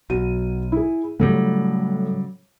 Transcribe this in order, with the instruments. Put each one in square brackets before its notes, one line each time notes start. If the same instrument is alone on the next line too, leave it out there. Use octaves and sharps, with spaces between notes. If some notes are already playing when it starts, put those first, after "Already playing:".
[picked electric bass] B1 [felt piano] F#3 D#7
[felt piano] E4 G#4
[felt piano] A2 [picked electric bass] C#3 F#3 G3